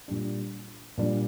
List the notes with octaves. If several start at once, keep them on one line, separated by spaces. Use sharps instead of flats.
A#2 G3 D4
A#2 G3 D4